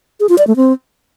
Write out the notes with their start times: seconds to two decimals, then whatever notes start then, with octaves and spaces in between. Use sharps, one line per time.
0.20 G#4
0.29 F4
0.38 D5
0.47 A3
0.56 C4